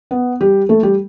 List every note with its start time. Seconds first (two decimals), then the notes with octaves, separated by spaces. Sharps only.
0.11 B3
0.41 G3 G4
0.69 A3 A4
0.83 G3 G4